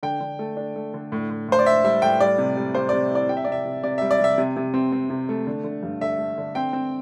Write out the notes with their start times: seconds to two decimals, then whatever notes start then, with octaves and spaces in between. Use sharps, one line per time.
0.03 D3 G5
0.21 D3
0.39 A3
0.57 D4
0.76 A3
0.94 D3
1.12 A2
1.30 A2
1.48 A2 C5
1.59 D5
1.66 D4 E5
1.84 G3 E5
2.02 A2 G5
2.20 G3 D5
2.38 C3
2.57 G3
2.75 C3 C5
2.89 C3 D5
3.11 E4 D5
3.29 C3 G5
3.37 E5
3.44 D5
3.47 C3 E5
3.66 C3
3.83 C3 D5
3.98 G3 E5
4.11 D5
4.20 C3 E5
4.38 C3
4.56 C3
4.74 C4
4.92 C4
5.10 C3
5.29 A3
5.47 D3
5.64 D3
5.83 G2
6.01 D3 E5
6.19 A3
6.38 D3
6.55 C4 G5
6.73 C4